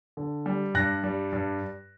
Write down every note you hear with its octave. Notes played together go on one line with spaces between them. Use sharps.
D3
G3
G2 F#6 A#6
G3
G2